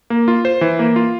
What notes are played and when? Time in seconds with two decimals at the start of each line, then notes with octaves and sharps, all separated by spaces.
0.10 A#3
0.28 F4
0.45 C5
0.61 E3
0.79 A#3
0.96 F4